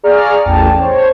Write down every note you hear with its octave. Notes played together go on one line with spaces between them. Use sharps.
G#4 D5 F5 A#5 C#6 F6
A1 E2 G5 A5
C5 C#5